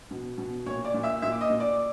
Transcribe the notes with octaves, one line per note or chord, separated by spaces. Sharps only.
B2
B2
A#2 C#5 C#6
D5 D6
A#2
E5 E6
A#2 E5 E6
D6
D#5 D#6
A#2
D5 D6